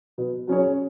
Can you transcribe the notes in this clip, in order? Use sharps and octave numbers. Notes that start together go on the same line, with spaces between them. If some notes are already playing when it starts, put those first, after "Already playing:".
B2
F#3 C#4 G#4 C#5